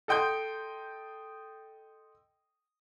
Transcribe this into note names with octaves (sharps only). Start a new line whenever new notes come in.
A4 D#5 G5 C6 G6